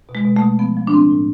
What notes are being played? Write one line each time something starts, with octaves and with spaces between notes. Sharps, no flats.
B2
G#3
B2
A3
B2
F3 B3
F3
D4
A2 C4
A2